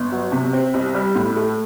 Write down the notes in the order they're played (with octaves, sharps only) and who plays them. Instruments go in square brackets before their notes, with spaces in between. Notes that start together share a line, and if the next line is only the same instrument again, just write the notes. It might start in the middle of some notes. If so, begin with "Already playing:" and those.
Already playing: [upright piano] G1
F#3
C3
C4
C2
G3
A2
A3